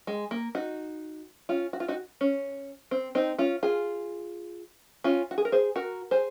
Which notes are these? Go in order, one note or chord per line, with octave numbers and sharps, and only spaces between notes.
G#3
A#3
D#4 F#4
C#4 F4
F#4
F4
D#4 F#4
C#4
C4
C4 D#4
C#4 F4
F4 G#4
C#4 F4
F#4
G#4
A#4
G#4 C5
F#4 A#4
G#4 C5